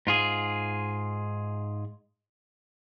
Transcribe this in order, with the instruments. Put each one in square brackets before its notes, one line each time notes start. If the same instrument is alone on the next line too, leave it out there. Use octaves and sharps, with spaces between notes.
[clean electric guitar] G#2 F4 G#4